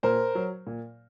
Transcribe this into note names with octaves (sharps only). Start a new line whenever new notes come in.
A#2 A#4 C5
F#3
A#2